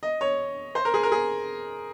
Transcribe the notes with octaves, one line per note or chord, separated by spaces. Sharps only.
D#5
C#5
C5
A#4
G#4
A#4
G#4